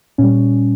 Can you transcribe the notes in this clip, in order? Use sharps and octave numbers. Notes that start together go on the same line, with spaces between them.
A#2 G3 C#4